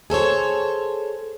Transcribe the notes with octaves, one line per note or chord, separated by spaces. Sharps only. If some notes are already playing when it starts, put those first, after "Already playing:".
G#4 A4 C5 C#5